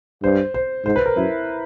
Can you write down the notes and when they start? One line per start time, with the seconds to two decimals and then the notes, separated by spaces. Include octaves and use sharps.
0.23 G2 C5
0.54 C5
0.85 G#2 C5
0.96 B4
1.06 A#4
1.16 F#2 E4